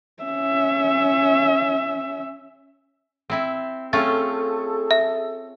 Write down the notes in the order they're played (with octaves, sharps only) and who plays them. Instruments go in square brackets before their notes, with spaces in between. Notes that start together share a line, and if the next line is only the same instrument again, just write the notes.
[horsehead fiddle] C#4 E5
[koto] C4 E4 E5
[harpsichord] A3 [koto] C4 C#4 F4 [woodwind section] G#4 A4 [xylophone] A6
[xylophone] E5